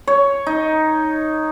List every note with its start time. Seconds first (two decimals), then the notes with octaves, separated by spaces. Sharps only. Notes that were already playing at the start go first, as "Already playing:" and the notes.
0.07 C#5
0.46 D#4